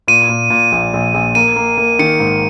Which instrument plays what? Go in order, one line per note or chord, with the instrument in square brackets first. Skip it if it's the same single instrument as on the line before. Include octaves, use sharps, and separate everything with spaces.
[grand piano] A#2 [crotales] D#7
[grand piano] A#2
A#2
A#1
A#1
A#1
[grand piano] A#3 [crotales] D#7
[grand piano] A#3
A#3
[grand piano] D#3 [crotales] C#7
[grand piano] G#2